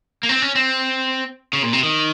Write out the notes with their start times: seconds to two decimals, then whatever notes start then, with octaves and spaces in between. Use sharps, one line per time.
0.23 A#3
0.29 C4
0.42 C#4
0.55 C4
1.53 C#3
1.63 A#2
1.73 C3
1.83 D#3